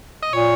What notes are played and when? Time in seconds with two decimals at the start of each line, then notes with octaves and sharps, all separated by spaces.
0.23 D#5
0.33 A#2 C#5